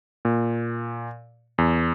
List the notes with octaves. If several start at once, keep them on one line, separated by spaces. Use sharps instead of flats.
A#2
E2